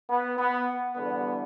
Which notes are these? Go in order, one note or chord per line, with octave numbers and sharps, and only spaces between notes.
B3
B3
E2 D3 G3 B3